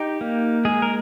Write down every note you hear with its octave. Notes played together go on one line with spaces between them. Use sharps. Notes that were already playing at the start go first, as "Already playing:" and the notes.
Already playing: D#4 G4
A#3
G#3 G#4
A#4